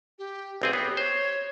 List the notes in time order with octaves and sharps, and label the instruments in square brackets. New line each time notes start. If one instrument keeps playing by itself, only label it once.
[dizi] G4
[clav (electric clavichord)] B1 C4 G#4 [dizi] G4
[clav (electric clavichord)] B3 [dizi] G4
[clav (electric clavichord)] C5 [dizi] C#5